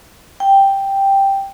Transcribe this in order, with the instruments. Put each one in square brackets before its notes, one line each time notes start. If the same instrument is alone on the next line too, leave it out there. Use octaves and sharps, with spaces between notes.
[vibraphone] G5